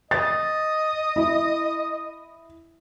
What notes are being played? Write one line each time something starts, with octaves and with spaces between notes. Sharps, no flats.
D#5 A6
E4